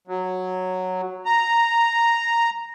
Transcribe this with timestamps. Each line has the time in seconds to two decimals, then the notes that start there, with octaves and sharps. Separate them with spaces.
0.08 F#3
1.25 A#5